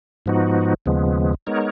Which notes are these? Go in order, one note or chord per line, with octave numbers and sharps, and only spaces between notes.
G#2 F3 B3 D#4 F#4
D#2 C#3 F3 G#3 B3
G#3 B3 D#4 A#4 C#5